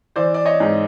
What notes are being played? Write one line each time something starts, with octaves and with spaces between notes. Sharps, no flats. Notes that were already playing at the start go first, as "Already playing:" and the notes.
E3 C5 D5
D5
C#5 D#5
G#2